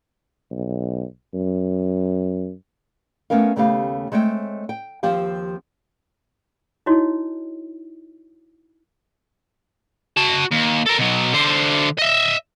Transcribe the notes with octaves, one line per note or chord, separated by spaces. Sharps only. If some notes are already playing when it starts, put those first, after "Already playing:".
B1
F#2
A3 B3 C#4 A#4 F5
D#2 C#3 A3 B3 G4 F5
G#3 A3 C4 C#5 G5
G5
D#2 F3 C4 G4 F5
D#4 E4 F#4 C#5 D#5
F#4 A5
D#2
A4 A#4
B2 F#3
D3 C5
D#5 E5